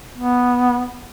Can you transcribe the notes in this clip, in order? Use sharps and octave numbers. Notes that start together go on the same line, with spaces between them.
B3